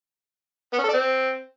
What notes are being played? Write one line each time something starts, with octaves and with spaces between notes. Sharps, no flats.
B3
C#4
A4
D5
C4